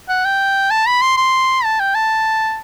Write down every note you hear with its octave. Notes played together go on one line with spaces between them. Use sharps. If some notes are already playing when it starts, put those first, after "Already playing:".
F#5
G5
A5
B5
C6
C6
A5
G5
A5